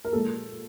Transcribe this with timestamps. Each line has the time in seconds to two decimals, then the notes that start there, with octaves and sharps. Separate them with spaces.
0.05 A#4
0.13 A#2 F3 G#3 A4